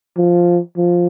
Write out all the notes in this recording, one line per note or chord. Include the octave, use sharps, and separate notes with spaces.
F3
F3